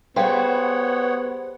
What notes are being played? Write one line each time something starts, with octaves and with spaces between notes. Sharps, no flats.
G3 B3 G4 G#4 C5 C#5 F5 F#5